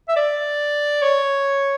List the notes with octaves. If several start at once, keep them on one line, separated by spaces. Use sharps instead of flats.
E5
D5
C#5